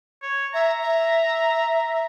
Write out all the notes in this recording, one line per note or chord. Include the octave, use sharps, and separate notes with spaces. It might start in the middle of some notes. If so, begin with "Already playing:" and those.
C#5
E5 A#5
E5